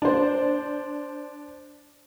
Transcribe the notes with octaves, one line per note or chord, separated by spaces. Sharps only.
D4 C5